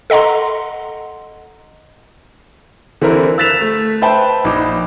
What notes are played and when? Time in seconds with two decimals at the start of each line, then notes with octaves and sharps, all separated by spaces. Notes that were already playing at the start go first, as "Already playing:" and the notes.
0.10 A4 D#5 F#5 A#5 C6
3.01 D3 E3 C4 E4 A#4
3.38 E6 F#6 A6 B6 E7 F7
3.61 A3
4.02 B4 C5 E5 G5 A5 B5
4.44 A#1 D#4 D6